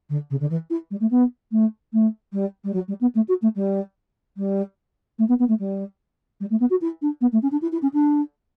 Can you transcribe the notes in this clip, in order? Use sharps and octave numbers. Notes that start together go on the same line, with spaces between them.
D3
C#3
D3
E3
E4
G3
A3
B3
A3
A3
G3
G3
F#3
G3
B3
A3
F#4
A3
G3
G3
A3
B3
B3
A3
G3
G3
A3
B3
F#4
E4
D4
B3
A3
C#4
D4
E4
E4
C#4
D4